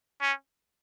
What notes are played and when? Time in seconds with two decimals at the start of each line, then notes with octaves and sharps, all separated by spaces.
0.21 C#4